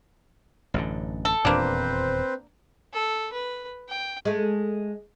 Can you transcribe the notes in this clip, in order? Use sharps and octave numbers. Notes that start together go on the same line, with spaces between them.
A1 F#2 D3
A4
D#1 E2 A#2 A#3 C4 D4 B4 C5
A4
B4
G5
G#3 A3